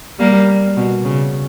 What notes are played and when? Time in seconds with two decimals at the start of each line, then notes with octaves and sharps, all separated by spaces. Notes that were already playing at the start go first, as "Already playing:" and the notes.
0.19 G3 A#3
0.76 B2
1.04 C#3